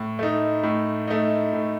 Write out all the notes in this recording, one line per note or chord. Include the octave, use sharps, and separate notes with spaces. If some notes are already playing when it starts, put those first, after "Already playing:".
Already playing: A2
A3 D#4
A2
A3 D#4
A2